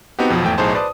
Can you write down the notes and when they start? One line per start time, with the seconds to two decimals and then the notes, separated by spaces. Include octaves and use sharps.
0.19 B3 C4 D#4 F#4 G4
0.30 F2 B2 F3 F#3
0.42 G#1 E2 A3 G5
0.58 B1 A2 D#4 G#4 C5 A5
0.74 B4 C5 D5 A5 D#6